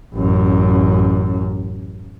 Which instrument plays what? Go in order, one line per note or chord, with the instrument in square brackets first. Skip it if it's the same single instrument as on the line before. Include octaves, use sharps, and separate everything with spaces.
[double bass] A1 F#2